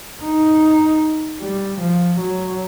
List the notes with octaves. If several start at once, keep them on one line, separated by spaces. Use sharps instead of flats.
D#4
G3
F3
F#3